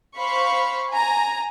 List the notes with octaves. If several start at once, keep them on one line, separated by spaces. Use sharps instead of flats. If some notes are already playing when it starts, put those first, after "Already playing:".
C5 F5 B5 C#6
G#5 A#5